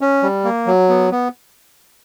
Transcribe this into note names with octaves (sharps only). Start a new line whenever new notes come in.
C#4
G3
A#3
F#3
B3
B3